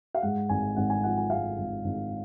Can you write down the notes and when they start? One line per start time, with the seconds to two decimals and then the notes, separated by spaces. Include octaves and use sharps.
0.15 F5
0.22 G#2 F#5
0.49 G#1 G#5
0.76 G#1 F#5
0.90 G#5
1.03 F3 F#5
1.18 G#5
1.30 G#2 F5
1.58 G#1
1.84 G#1